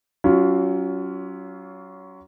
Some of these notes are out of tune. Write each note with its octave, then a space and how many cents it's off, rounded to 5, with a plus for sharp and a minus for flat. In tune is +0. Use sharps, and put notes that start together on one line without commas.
F#3 +30 C#4 +20 F4 +0